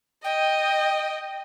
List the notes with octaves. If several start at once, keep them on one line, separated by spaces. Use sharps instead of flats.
D#5 G5